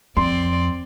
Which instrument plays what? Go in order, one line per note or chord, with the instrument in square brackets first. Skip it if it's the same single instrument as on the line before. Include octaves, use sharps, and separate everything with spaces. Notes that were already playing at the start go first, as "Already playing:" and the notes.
[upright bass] F2 [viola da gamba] C4 D5 [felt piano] C6